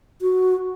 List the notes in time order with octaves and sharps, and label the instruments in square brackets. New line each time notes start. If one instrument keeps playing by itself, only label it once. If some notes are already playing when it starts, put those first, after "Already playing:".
[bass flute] F#4